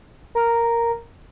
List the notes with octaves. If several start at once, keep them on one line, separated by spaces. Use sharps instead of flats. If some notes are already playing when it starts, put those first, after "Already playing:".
A#4